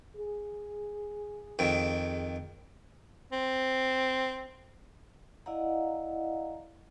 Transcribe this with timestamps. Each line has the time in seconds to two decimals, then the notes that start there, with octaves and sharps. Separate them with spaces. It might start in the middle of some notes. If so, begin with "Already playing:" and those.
0.16 G#4
1.59 F2 D#3
3.32 C4
5.46 E4 D5 D#5 F5 F#5 A#5